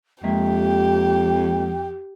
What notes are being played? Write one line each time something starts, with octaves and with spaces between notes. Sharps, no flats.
F2 G#3 A#3 G4 E5 G5